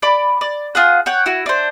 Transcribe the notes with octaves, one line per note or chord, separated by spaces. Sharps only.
D5 B5 D6
D5
F4 G#4 F#5
C#5 F#5 G5
E4 F#4
D4 C5